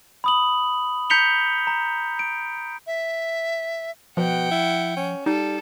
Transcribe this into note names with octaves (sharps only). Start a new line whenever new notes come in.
B5 D#6 F#7
A#5 G6 B6 C#7 F7 G7
A#5
D7
E5
B2 F3 F#5 G5
E4
C#4
G3 D#4 A4